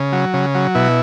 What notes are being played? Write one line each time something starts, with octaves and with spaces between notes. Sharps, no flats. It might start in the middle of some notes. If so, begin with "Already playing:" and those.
Already playing: C#3
F#3
C#3
F#3
B2 E4